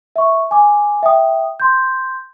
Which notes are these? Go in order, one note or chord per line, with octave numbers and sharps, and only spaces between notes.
E5 C#6
G#5 D6
E5 G5 D#6
C6 G6